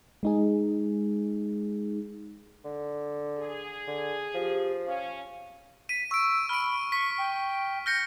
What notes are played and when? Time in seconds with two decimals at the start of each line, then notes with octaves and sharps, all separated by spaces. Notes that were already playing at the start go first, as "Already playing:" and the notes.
0.23 G#3 D#4 G#4
2.64 D3
3.37 G#4
3.87 D3
4.34 F3 G4
4.87 C#4 F5
5.89 B6 D#7
6.11 C#6 E6 D7
6.49 B5 F6 D7
6.92 C#6 B6
7.18 G5
7.86 F6 G6 A#6 C#7